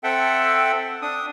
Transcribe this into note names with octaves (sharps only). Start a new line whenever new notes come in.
C4 A4 E5 F#5 G5
D4 D#6